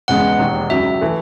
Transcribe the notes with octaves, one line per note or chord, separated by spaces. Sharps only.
E1 E2 C#3 G#3 B3 F#5
E1 D#2 D#3
C#2 C#3 F#3 E5
E3 A3